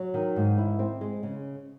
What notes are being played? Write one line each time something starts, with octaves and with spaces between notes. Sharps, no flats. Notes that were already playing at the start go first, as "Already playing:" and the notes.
Already playing: F#3
D#3
G#2
E4
C4
G#3
C#3